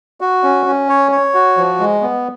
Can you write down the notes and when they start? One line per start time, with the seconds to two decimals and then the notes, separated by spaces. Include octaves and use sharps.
0.21 F#4
0.43 C#4
0.66 C#4
0.89 C#5
1.12 C#5
1.34 F#4
1.57 F3
1.80 G#3
2.02 B3